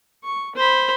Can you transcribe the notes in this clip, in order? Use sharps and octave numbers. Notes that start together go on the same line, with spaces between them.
C#6
C5 B5